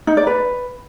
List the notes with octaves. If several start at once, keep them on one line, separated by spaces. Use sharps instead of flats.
D#4
D5
B4